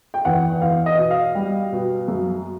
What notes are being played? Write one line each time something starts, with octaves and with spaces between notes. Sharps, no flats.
G5
E2 F#5
E2 F5
D#5
B2
F5
G3
B2
F#2